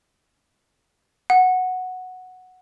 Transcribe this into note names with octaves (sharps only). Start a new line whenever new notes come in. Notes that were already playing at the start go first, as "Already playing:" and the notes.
F#5